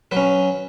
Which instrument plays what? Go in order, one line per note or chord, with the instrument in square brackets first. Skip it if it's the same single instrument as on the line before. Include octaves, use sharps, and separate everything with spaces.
[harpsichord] F#3 C#4 B4